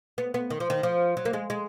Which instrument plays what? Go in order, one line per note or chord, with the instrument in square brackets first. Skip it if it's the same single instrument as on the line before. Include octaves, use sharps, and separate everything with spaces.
[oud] B3
B3
D#3
F3
D#3
F3
F#3
A#3
G#3
G#3